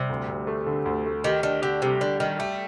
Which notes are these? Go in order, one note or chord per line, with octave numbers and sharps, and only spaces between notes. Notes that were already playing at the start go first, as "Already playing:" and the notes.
Already playing: C3 G3
D2
D2
A3
D3
D2
A3
D#3 G4
D#3 D4
D3 G4
C3 G3
D3 D4
D#3 G3
A3 G4